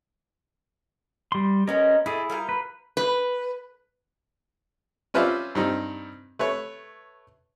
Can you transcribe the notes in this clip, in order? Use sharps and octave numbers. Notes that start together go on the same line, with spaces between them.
G3 C6
G#3 B3 C#4 A#4 D#5
A3 E4 G#4
G3 F4 A#4
B4
B4
C#4 F4 B4 C5 D5 E5
G2 C4 D#4
A3 B4 C#5